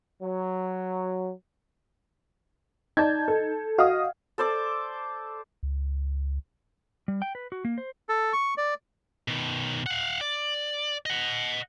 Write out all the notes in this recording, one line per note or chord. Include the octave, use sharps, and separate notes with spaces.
F#3
D#4 D5 A5 G6 G#6
A4
F#4 D#5 F5 D#6
A4 C5 D5 D6
C#2
G3
G5
B4
F#4
A#3
C5
A4
C#6
D5
B2 D#3
F5 F#5
D5
D#5 F#5